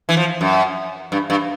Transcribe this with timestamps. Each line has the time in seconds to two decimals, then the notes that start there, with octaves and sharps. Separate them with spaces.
0.09 E3
0.17 F3
0.41 F#2
1.12 G2
1.30 G2